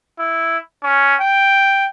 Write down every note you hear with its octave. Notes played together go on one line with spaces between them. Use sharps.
E4
C#4
G5